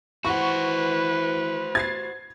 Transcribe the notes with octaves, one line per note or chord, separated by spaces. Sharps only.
E3 F#4 B4 C5 F#5 C#6
G#6 A6 C7